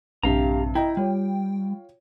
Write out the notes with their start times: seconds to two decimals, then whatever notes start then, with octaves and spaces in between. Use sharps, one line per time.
0.23 A#1 G2 C3 G4 F5 A#5
0.75 E4 D#5 G5 A#5
0.97 G3 F4 C#5